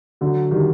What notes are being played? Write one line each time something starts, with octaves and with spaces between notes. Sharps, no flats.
D3 F#3
D#3 G3